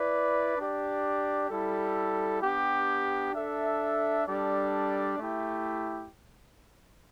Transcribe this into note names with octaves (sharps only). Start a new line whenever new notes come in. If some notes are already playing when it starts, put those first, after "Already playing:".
Already playing: E4 B4 D5
D4 G4 D5
G3 E4 A4
B3 D4 G4
D4 A4 E5
G3 D4 A4 D5
A3 E4 G4